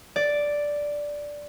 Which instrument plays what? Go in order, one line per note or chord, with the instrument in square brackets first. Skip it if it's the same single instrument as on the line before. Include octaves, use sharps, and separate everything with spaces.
[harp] D5